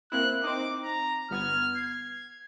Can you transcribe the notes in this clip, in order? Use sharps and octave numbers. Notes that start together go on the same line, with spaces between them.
A#3 C4 E4 F#6
C4 D#4 D6
A#5
G1 B3 F6 G#6
G#6 C7